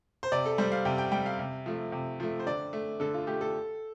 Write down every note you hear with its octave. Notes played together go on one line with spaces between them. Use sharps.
C5
C3 D5
A4
G3 C5
F5
C3 G5
G5
G3 G5
F5
C3
F3 A3
C3
F3 A3
C5
D3 D5
A3
D3 A4
F4
A3 G4
A4